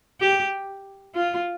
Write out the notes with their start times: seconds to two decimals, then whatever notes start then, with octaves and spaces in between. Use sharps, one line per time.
0.20 G4
1.15 F4